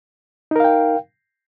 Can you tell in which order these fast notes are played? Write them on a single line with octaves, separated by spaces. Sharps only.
D#4 A#4 F5 G5